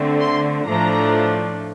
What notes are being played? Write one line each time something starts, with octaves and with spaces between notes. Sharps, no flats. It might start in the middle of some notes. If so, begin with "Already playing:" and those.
Already playing: D3 A3 C4
C6
A2 F3 A3 D4 A#5